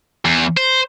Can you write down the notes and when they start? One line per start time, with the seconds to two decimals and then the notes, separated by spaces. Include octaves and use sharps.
0.25 E2
0.57 C5